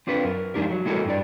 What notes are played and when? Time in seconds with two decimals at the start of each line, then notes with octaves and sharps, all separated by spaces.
0.07 C4 D4 F4 B4
0.24 F#2 A#4
0.54 F3 G#3 D4 D#4 G4 A#4
0.71 F#3
0.86 G#3 B3 E4 F#4 A4 A#4
1.05 G2 D4 D5